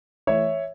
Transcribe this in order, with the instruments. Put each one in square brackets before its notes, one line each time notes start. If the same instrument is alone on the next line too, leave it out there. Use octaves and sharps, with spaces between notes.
[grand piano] E3 A3 C#5 E5